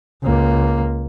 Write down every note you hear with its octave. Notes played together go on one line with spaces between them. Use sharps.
C#2 A#3